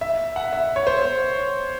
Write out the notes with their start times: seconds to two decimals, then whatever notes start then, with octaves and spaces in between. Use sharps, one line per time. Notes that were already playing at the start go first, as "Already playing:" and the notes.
0.01 E5
0.36 F#5
0.53 E5
0.76 C#5
0.87 C5